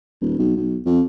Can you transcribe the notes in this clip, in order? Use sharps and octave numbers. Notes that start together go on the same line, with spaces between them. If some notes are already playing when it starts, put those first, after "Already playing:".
D#1
B1
B1
F2